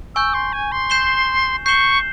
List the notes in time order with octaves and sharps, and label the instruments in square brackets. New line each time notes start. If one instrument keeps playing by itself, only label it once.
[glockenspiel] G#5 C#6 G6 [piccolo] E6
[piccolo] C6
G#5
C6
[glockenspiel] G6 C7 E7 G7
[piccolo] C#6 [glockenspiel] G6 C7 E7 G7